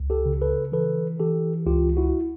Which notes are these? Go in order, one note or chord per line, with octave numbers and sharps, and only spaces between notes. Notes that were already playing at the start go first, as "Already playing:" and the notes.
Already playing: C#2
G4 A4
C#3
A4 B4
E3 A4 B4
E3 G4 A4
C#2 F4 G4
E4 F#4